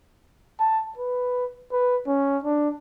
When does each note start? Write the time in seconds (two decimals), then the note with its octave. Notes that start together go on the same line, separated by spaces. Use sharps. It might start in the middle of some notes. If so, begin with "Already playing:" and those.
0.60 A5
0.98 B4
1.72 B4
2.07 C#4
2.44 D4